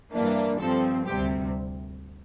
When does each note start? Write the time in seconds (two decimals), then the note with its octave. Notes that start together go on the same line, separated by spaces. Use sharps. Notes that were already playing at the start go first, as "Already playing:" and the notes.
0.13 G2 E3 A#3 D4
0.60 G2 F3 C4 A4
1.06 D2 C3 G3 C4 G4